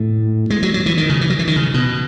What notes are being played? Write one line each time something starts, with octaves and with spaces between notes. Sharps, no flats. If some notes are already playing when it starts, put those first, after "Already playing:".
Already playing: A2
G#3
F#3
F#3
E3
D#3
C#3
E3
F#3
E3
D#3
C#3
B2